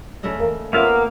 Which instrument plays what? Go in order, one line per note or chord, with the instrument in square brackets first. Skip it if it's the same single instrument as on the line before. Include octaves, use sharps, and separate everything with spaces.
[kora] C#3 A3 D#5
[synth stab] E2 A#3
[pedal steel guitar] A#3 F5 [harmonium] B3 A#4 [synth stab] C#4 F4 E5